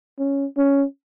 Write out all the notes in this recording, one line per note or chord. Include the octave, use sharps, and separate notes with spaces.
C#4
C#4